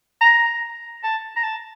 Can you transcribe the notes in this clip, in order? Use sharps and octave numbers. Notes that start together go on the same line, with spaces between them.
A#5
A5
A#5
A5